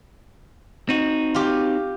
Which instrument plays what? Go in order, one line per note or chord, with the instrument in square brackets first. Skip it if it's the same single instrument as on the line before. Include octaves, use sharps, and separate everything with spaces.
[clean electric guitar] C4 D#4 F#4
[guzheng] F4 G4